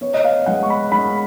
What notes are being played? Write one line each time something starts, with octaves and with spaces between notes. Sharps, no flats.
B3 C#5
D#5
F5
G#3 F#5
C#6
B5
G#3 B5